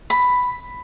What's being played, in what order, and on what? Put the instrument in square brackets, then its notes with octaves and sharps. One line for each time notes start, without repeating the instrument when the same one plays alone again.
[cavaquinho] B5